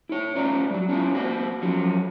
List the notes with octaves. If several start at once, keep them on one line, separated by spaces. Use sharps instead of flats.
E4 C#5
A2 C#4 F4 D5 A#5
F#3 G3
C#4 D4 E4 F4 C#5
A#3 C4 F#4
F3 F#3 C#4 F#4